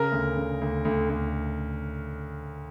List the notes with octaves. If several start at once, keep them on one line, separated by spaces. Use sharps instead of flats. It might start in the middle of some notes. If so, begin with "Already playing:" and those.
Already playing: C#3 A#4
D2
C#3
D2
D2
D2